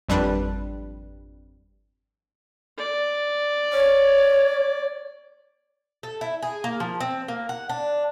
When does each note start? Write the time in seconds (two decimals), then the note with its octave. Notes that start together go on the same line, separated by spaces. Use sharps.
0.09 G#1 F2 G3 D4 B4
2.78 D5
3.73 C#5
6.03 A4
6.21 E4
6.42 G#4
6.64 A#3
6.80 F3
7.00 C4
7.28 A#3
7.49 F#5
7.69 D4